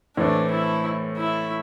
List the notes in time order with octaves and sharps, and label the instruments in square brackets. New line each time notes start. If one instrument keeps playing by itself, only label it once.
[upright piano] A2 E3 A3 C4 [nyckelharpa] D4
[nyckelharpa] E4
E4